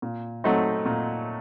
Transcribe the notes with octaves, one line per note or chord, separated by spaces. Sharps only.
A#2
F#3 A3 C4 D#4
A#2